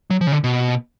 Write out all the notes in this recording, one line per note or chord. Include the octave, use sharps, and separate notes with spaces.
F#3
F3
C#3
D3
B2